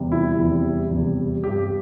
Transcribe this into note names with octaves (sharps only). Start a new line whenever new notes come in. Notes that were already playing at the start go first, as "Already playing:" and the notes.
Already playing: E2 C3 G3
E4
E2 C3 G3
E2 C3 G3
G2 G3 G4